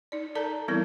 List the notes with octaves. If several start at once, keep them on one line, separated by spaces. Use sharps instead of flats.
D#4 D5
A4 A#4 D5 A5 A#5
E3 G3 B3 C4 E4 A#4